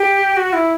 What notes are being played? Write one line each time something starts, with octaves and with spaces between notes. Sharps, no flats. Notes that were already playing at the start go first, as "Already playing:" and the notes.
Already playing: G4
F#4
E4